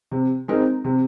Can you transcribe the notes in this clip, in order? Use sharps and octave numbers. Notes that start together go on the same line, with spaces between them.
C3
G#3 C4 D#4 A#4
C3